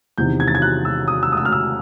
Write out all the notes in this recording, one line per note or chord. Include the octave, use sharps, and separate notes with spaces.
E2 C3 D#3 G6
G#6
A6
G#6
F#6
E6
D#6
E6
D#6
E6
F6
E6